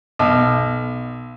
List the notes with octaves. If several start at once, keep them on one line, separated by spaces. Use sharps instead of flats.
B1